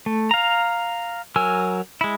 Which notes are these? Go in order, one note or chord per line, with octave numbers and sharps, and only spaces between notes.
A3
F5 A#5
F#3 A#4 G#5 E6
G#3 E4